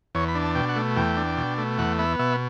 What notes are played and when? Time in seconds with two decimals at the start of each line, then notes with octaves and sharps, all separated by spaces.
0.15 E2 C#5
0.28 B5
0.35 D4
0.42 A5
0.55 B2 G5
0.69 F#5
0.76 A3
0.96 E2 G5
1.17 D4
1.37 B2
1.58 A3
1.78 E2 F#5
1.99 B3 E5
2.19 B2 E5